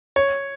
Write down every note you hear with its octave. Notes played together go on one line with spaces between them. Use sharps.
C#5